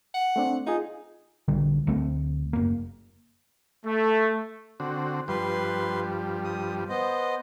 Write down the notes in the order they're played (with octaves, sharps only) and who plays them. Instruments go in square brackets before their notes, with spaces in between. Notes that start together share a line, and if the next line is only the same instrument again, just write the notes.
[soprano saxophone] F#5
[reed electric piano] A3 C4 D4
[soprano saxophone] D#4 [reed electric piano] F4 G#4
[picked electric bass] A#1 D3 G3
D2 F#3 A3 C4
F#1 A#3
[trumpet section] A3
[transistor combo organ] D3 C4 F#4
[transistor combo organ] G2 F3 G3 [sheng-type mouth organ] B4 C6
[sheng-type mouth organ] D#6
B3 C5 D#5